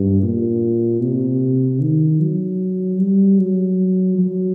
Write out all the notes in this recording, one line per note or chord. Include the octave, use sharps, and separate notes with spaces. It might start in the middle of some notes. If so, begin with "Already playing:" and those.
Already playing: G2
A#2
C3
D#3
F#3
G3
F#3
F#3